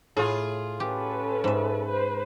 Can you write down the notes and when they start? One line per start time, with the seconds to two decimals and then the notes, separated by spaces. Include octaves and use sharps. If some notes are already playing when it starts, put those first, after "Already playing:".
0.17 A2 F4 G#4
0.80 C#4 G4 A4 B4
1.44 G#2 E5
1.87 B4 C5